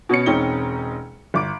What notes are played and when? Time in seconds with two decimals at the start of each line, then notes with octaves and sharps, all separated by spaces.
0.09 B2 B3 C#4 C#7
0.26 E1 C4 C#4 D#4 G7
1.34 G1 D6 D7